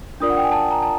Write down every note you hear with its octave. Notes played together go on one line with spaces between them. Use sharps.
D4 F4 A#4 D5 D#6
F#5
G5
G#5
A5
A#5
A5